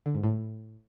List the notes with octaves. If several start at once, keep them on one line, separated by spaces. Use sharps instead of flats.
D3
G#2
A2